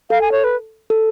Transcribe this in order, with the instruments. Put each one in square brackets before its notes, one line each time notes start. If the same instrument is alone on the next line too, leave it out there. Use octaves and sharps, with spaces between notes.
[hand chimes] A4 [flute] F5
[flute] G#5
C#5
B4
[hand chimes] A4